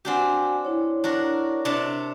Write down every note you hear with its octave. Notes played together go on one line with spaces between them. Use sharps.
C4 D4 F#4 G4 F#5 G#5
E4 C#5
D4 F#4 A#4
C3 D4 A5